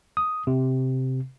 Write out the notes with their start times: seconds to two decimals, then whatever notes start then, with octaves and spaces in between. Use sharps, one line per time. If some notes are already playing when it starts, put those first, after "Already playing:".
0.17 D#6
0.47 C3